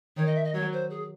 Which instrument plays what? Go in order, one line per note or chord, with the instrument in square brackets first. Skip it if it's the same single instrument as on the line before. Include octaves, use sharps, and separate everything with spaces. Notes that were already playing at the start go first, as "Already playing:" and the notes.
[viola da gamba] D#3 [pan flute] C#5
[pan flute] D#5
E5
D#5
[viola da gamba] F#3 [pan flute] C#5
[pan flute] C5
G#4